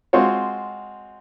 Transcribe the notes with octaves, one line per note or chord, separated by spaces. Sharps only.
G#3 C4 F4 F#4 C#5